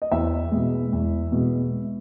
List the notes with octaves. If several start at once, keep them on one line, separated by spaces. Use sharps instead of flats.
D#5
E2 E4 E5
B2 G#3
E2
B2 G#3